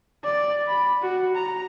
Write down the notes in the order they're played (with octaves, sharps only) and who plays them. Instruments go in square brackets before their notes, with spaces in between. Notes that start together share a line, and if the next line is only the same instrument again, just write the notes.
[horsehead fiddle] D5
B5
F#4
A#5